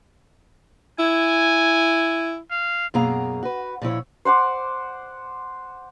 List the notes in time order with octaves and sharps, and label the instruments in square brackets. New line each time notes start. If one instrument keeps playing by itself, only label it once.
[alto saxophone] E4 [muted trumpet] G#5
[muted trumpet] F5
[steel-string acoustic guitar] F#2 B2 A#3 G#4 F5 A#5
F#4 B4
A#2 F3 E4 C#5
[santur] C5 F#5 C6 D6